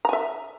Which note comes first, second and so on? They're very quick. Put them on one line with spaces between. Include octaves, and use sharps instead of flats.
A#5 G#5 E5